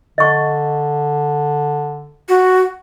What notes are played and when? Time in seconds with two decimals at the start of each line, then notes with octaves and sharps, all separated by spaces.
0.18 D3 D#5 C#6
2.29 F#4